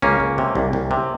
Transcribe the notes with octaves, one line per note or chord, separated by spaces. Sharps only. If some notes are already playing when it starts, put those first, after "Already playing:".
C#2 A#3 C#4
C#2
C3
C2
C2
C3